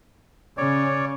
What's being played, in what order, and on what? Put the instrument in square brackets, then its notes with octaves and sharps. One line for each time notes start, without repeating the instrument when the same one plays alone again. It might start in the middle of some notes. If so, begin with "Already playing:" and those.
[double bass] C#3 C#4 [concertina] C#5 D5